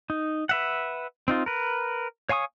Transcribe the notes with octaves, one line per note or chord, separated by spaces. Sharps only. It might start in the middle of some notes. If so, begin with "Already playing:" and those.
D#4
B4 E5 F#5
C4 D#4 F4
A#4 B4
C#5 F5 G#5 C#6 D#6